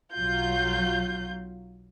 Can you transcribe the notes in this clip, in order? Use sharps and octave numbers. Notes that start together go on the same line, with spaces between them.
B1 F#3 F4 G6